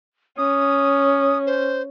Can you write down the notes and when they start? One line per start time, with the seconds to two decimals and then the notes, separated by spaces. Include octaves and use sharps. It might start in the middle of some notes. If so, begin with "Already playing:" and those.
0.38 C#4 D#6
1.46 C5